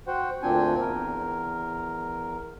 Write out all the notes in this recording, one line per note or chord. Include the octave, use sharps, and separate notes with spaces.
F#4 C5 F#5 G5
D2 A#2 C4 D4 G5 G#5
E2 A#4